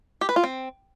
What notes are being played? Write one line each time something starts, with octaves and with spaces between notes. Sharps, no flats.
G4
B4
F4
C4